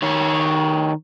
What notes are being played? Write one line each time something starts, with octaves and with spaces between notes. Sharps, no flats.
D#3 C#5